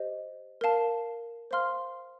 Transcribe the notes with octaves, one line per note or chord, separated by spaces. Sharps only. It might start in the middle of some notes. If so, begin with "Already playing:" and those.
Already playing: G4 C5 D#5
A#4 F5 A5
C5 F5 C6 F6